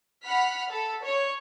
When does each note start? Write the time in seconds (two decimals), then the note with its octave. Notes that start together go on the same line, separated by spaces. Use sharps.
0.24 F#5 B5 F6 B6
0.70 A4
1.04 C#5